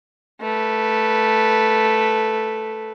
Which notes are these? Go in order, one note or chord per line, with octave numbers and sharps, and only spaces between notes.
A3 B4